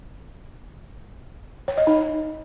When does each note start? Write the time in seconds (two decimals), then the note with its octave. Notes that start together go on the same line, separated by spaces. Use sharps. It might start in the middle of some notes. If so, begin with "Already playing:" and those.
1.68 C#5
1.78 D#5
1.87 D#4